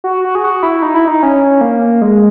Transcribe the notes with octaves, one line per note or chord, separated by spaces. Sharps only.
F#4
F#4
G#4
F#4
E4
D#4
E4
D#4
C#4
A#3
G#3